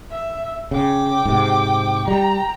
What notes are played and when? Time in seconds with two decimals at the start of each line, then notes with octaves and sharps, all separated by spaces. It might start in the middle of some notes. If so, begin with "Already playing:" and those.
0.11 E5
0.71 C#3 G5 D6
1.25 G#2 C3
2.08 G3 G5 A#5